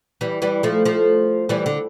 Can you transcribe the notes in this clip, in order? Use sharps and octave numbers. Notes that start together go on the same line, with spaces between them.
E3 G3
E3 G3
F3 A3
F3 A3
E3 G3
D3